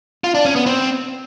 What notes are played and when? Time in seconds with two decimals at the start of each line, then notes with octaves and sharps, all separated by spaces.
0.24 F4
0.35 D4
0.45 C#4
0.56 B3
0.66 C4